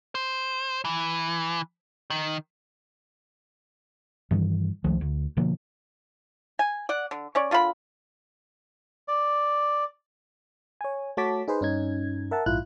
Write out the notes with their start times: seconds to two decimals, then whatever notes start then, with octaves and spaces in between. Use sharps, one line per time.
0.15 C5
0.85 E3
2.10 D#3
4.31 G2 D#3 E3 G3
4.84 C#2 D#3 F3 A3
5.01 D2
5.37 B2 D3 F3 A#3
6.59 G#5
6.89 D5 F#5
7.11 D3
7.35 C#4 C#5 D5
7.51 D3 F4 A#4 B5
9.08 D5
10.81 C#5 G#5
11.17 A3 F#4 C#5 A5 D6 B6
11.48 D#4 G#4 B4 C5
11.61 G2 C#4 D#4 G#6
12.31 A#4 E5 F#5 A5
12.46 A#1 G#2 E4 F4 F#6